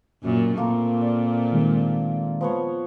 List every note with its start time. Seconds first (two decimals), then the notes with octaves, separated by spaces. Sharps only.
0.23 F#2 A#2
0.57 A#2 A3 A#3 C4 F4
1.01 D5
1.52 D#3 G#3
2.41 F3 B3 C#5